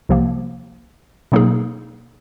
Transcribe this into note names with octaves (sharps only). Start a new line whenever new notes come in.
C2 C3 F3 A#3
B2 F#3 A#3 D#4 G#4